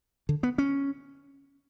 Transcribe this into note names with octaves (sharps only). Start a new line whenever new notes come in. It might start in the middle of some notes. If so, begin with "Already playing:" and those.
D3
B3
C#4